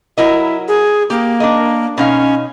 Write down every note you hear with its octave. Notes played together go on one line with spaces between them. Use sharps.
F#3 E4 A#4 D#5
G#4
A#3 G4
D4 A#4 D#5
B2 C#4 D#4 F5